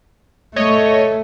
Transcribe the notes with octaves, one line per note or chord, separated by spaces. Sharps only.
A3 C#5 D#5